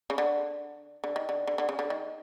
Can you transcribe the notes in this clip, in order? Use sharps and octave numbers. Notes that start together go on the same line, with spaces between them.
C#3
D3
D3
D#3
D3
D3
D3
C#3
D3
D#3